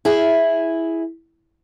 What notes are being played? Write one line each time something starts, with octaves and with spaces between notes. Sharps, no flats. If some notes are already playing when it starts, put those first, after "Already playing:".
E4 G#4